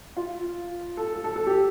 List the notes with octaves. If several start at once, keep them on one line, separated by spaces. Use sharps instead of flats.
F4
A4
A4
A4
A4
G4